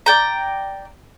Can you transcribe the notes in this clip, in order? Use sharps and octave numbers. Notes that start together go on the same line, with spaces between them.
D5 G5 A#5